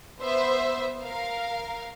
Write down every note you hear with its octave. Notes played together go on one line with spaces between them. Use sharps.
B3 C5 E5
A#4 F5